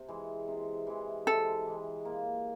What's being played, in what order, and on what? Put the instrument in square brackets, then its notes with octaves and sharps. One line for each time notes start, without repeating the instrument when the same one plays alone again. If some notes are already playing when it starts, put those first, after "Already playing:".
Already playing: [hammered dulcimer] C3
E3 G#3
C3
E3 G#3
[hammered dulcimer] C3 [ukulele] A4
[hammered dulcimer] E3 G#3
A#3